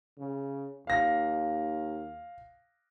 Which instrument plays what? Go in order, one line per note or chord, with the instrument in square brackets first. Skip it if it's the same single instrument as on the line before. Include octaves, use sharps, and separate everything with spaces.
[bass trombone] C#3
[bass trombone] D#2 [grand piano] F5 A#6